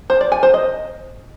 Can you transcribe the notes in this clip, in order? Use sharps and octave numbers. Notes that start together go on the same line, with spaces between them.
C5
D5
G#5
C5
D#5